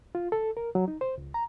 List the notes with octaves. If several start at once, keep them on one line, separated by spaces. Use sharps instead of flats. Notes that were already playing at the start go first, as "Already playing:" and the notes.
F4
A4
A#4
F#3
D#4
C5
C#2
A#5